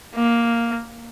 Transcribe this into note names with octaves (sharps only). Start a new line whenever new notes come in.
A#3